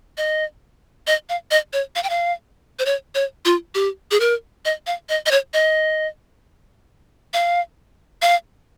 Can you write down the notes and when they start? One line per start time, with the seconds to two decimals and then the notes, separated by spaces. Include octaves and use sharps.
0.18 D#5
1.07 D#5
1.29 F5
1.51 D#5
1.73 C#5
1.96 F5
2.03 G5
2.10 F5
2.79 C5
2.86 C#5
3.15 C#5
3.45 F4
3.75 G4
4.11 G#4
4.20 A#4
4.65 D#5
4.87 F5
5.09 D#5
5.26 D#5
5.31 C#5
5.54 D#5
7.34 F5
8.22 F5